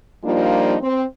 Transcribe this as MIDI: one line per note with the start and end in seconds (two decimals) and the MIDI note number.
0.24 0.75 53
0.24 0.75 55
0.24 0.75 58
0.24 0.75 62
0.24 0.75 63
0.24 0.75 65
0.81 1.04 60